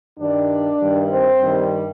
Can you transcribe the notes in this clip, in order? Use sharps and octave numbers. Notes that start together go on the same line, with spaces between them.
G2 D#3 G3 D4 D5
G2 D#3 G3
C4 C5
G2 D#3 G3